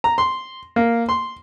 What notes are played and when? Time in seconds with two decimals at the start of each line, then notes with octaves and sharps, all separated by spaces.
0.04 A#5
0.18 C6
0.76 A#3
1.09 C6